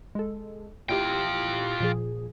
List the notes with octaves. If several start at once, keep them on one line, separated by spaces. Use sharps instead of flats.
G#3 A4
A#2 E4 F4 G4 G5
A#2 F3 G#4